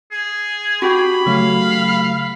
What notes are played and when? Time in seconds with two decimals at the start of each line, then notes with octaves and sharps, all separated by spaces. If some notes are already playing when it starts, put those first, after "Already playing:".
0.11 G#4
0.82 F#4 G4 B5
1.26 C#3 F#3 A3 F5